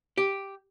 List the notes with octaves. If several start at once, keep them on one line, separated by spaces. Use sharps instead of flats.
G4